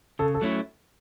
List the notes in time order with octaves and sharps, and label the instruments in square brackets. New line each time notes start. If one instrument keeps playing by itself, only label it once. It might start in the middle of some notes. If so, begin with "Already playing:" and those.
[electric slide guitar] C#3 [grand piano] A4
[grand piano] A4
[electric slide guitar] F#3 A3 C#4 E4